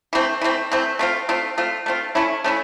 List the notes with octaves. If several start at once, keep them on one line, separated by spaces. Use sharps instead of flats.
E3 A3 C4
E3 A3 C4
E3 A3 C4
A3 C4 F4
A3 C4 F4
A3 C4 F4
A3 C4 F4
A3 C#4 E4
A3 C#4 E4